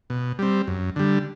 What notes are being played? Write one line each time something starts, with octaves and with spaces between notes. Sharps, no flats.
B2
G3 C4
F#2
D3 G3